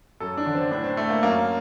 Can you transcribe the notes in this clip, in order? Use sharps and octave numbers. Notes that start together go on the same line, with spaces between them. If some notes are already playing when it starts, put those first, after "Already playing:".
F#2 A4
D4
D3
C4
A2 D4
C4
A3
A#3
F#2 A#3